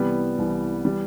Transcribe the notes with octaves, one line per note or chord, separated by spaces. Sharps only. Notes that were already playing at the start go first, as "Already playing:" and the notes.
Already playing: C2 C3 E3 G3 B3
C2 C3 E3
E3 G3